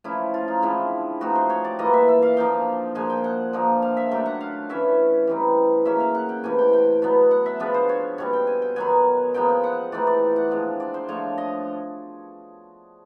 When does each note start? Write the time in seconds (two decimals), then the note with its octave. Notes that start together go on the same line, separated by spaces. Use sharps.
0.04 F3 A3 C#4 E4
0.34 F4
0.48 D#4
0.62 D3 F3 G#3 C4 E4
1.21 F3 A3 C4 D#4 F#4
1.35 C5
1.50 C#5
1.64 D5
1.79 E3 G3 A#3 D#5
1.93 E5
2.08 E5
2.22 F5
2.37 D3 F3 A#3 D#4 G5
2.95 A#2 F3 G#3 G#5
3.10 G5
3.24 F#5
3.53 D3 F3 A#3 D#4
3.82 F5
3.97 E5
4.11 D3 F#3 A3 G5
4.26 F#5
4.41 F5
4.69 E3 A3 C#4 E5
5.27 E3 G3 C4 D#4
5.85 C#3 F#3 A#3 C#4 E5
6.00 F5
6.15 F#5
6.29 G5
6.44 C3 E3 A3 G#5
6.58 G5
6.73 G5
7.02 B2 F#3 B3
7.31 F#5
7.46 E5
7.60 F3 G#3 B3 D4 B4
7.74 C5
7.89 C#5
8.18 B2 G3 C4 C#5
8.33 G5
8.47 G#5
8.62 G5
8.76 D#3 F#3 B3 G#5
9.34 F3 G#3 B3 D#4 G5
9.49 G5
9.64 F#5
9.92 E3 A3 C4 D#4 D5
10.07 D5
10.36 F#5
10.51 D3 F3 G#3
10.80 D5
10.94 C5
11.08 D3 F3 A3 C#5
11.38 D#5